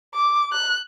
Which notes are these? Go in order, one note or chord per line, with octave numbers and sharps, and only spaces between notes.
D6
F#6